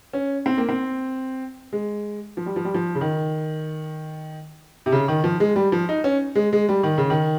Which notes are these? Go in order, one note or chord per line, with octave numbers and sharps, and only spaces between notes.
C#4
C4
A#3
C4
G#3
F3
G3
F3
G3
F3
C#3
D#3
C3
C#3
D#3
F3
G#3
G3
F3
D#4
C#4
G#3
G#3
G3
D#3
C#3
D#3